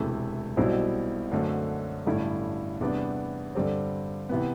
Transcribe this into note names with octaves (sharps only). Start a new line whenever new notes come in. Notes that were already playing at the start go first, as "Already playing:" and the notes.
Already playing: E1 D2 C3 E3 A3
B1 B2 G3 C4 E4
F#2 D3 A3 C4
A1 G2 D3 A3 E4
E2 C3 G3 B3 D4
G2 D3 G3 C4
C3 E3 B3